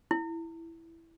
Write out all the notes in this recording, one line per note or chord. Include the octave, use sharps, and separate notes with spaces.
E4